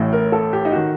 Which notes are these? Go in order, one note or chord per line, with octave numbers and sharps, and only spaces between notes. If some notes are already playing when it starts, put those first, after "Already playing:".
Already playing: A1 A2 A3
A#4
A4
G4
D#4
D#3 F#4